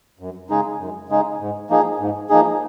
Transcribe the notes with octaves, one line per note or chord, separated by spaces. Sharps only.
F#2
C#3 G#3 D#4 G#4
F#2
C#3 G#3 D#4 G#4
G#2
F3 A#3 D#4 G#4
G#2
F3 A#3 D#4 G#4